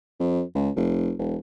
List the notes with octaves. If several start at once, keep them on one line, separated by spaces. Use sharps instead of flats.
F2
C#2
F1
E1